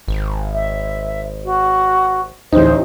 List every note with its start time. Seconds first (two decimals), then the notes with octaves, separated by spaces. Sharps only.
0.08 G#1
0.54 E5
1.45 F#4
2.52 A1 D2 D#4 C5